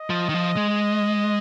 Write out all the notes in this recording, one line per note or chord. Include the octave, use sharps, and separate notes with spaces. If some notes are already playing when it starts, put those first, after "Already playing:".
Already playing: D#5
F3
D#3
F3
G#3